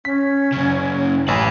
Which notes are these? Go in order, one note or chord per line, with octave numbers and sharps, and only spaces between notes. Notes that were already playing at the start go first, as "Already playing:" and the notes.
C#4 B6
F#2 C#3
A1 G#5 A5 B5